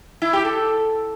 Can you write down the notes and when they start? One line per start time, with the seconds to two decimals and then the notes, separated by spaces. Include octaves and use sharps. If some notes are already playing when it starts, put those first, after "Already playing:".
0.22 E4
0.33 G4
0.45 A4